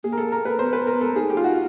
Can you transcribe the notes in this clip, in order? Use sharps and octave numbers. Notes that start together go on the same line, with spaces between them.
A#3 G#4
A#4
A4
A#4
B4
B3 C5
B4
A#4
A4
D#4 G#4
G4
F4
F#4